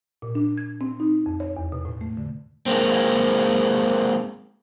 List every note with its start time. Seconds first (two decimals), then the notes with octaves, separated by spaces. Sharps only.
0.22 A#2
0.35 D4
0.57 G#6
0.81 C4
1.00 D#4
1.26 F2
1.40 C#5
1.57 E2
1.72 B2
1.85 A2
2.01 A3
2.17 D3
2.66 G#3 A#3 C4